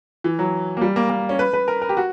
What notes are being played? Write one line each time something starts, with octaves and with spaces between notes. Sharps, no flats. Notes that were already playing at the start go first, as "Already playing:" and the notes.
E3
F#3
A#3
G3
A#3
A#3
C#4
B4
B4
A#4
A#4
G4
F#4